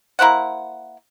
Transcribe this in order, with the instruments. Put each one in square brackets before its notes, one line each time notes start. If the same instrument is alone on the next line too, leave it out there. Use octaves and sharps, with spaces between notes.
[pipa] A#3 E4 C5 F#5